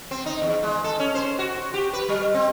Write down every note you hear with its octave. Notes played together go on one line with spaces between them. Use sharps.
C4
D#4
E2
G#3
A4
C#4
C5
F#4
G4
B4
G3
C4